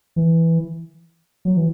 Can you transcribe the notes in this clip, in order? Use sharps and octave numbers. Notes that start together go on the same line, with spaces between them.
E3
F#3
E3